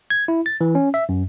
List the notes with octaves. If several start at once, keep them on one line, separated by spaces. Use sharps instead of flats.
G#6
E4
A6
E3
C#4
E5
F#2